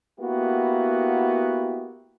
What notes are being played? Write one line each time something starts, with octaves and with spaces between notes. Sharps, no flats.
A#3 B3 E4 F#4 G4